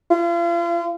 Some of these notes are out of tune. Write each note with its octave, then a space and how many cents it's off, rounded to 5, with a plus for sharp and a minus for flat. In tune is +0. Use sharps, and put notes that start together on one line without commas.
F4 -40